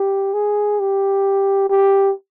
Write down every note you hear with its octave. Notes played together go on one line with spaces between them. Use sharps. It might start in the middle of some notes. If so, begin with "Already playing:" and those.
Already playing: G4
G#4
G4
G4